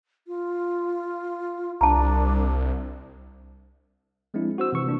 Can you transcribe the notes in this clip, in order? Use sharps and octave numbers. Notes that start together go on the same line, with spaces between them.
F4
C2 D4 A5 A#5
F3 G#3 C4 D4 E4
F#4 C5 E6
C3 E3 C#6
C3 E3 A#3 D4